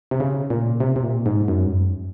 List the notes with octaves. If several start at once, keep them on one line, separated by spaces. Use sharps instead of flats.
C3
C#3
A#2
C3
C3
A#2
G#2
F#2
G#2
F#2